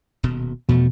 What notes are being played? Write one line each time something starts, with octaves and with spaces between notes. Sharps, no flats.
D#1 B2
E2 B2 F3 A3